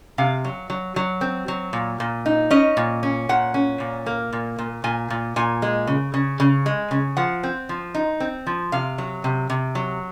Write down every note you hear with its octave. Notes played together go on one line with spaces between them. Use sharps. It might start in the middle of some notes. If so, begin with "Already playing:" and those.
C3 F5
F#3
F#3
F#3
C4
F#3
A#2
A#2
D#4
C#4 D#5
A#2
C#4
A#2 F#5
C#4
A#2
A#3
A#2
A#2
A#2 G#5
A#2
A#2 G#5
G#3
C#3
C#3
C#3
G#3
C#3
F3 F#5
C4
F3
D#4
C4
F3
C3 F5
F#3
C3
C3
F#3